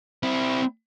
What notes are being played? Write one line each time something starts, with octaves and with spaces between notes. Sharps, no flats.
C4 E4